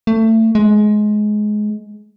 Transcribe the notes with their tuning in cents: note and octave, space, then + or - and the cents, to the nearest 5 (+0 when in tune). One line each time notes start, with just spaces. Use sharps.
A3 +25
G#3 +20